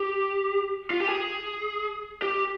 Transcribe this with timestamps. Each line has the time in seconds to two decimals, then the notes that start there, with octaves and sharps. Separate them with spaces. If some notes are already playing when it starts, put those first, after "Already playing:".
Already playing: G4
0.90 F4
1.00 G4
1.09 G#4
2.22 G4